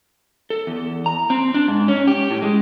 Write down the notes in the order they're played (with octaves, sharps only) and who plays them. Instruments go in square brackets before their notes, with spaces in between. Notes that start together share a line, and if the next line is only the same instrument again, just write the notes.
[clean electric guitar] A4
E2
A#5
C4
D4
G#2
C#4
G4
A2
G#3